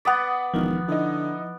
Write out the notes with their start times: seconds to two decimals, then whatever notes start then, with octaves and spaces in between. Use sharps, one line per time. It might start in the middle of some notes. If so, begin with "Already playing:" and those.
0.05 B3 D5 F#5 D#6 B6
0.54 E1 D#3 F3
0.88 D3 D#4 E4